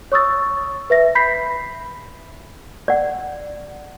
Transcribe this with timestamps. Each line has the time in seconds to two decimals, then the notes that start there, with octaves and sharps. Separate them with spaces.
0.12 C#5 C#6 D#6 E6 A6
0.90 B4 E5 A#6
1.15 B5 G6 B6 C7
2.88 D5 F#5